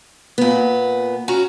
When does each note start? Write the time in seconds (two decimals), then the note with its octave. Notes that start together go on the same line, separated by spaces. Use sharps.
0.38 A#2 B3
1.28 C#4 F#4 A#5